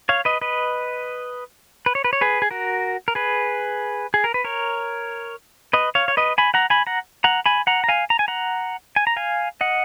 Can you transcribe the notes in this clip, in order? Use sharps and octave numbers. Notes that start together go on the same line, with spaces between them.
C#5 F5
B4 D#5
B4 D#5
B4
C#5
B4
C#5
G#4 B4
G#4
F#4 A#4
A#4
G#4 B4
G#4
A#4
B4
A#4 C#5
B4 D#5
C#5 F5
C#5
B4 D#5
G#5 B5
F#5 A#5
G#5 B5
F#5 A#5
F#5 A#5
G#5 B5
F#5 A#5
A#5
F5 G#5
A#5
G#5
F#5 A#5
G#5
A#5
F5 G#5
D#5 F#5